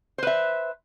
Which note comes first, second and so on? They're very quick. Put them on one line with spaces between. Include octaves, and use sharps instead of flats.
C5 B4 E5